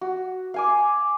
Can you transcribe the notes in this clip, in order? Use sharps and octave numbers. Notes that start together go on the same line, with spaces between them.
F#4
F5 G#5 D6